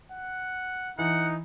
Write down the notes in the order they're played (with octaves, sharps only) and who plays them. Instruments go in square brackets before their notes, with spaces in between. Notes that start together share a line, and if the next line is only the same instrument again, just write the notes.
[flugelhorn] F#5
[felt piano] E3 [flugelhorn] D#4 [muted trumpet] F#5